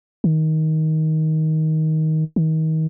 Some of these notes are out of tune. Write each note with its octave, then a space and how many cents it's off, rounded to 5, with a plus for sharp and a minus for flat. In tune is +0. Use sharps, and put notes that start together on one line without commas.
D#3 +15
D#3 +30